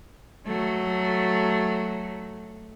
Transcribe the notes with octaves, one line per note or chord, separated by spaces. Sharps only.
F#3 A3